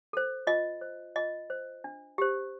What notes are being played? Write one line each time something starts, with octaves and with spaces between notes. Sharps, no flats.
A4 C5
F4 D#5
C5
F4 D#5
C5
D4
G4 C5